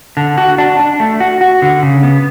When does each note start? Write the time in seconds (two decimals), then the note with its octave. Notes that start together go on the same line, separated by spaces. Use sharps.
0.17 D3
0.38 F#4
0.58 D4
0.80 D4
1.00 A3
1.20 F#4
1.41 F#4
1.62 D3
1.83 C#3
2.03 B3